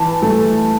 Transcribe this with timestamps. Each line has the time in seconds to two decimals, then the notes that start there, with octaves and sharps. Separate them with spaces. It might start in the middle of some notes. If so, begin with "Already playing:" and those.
Already playing: E3 A5
0.22 A3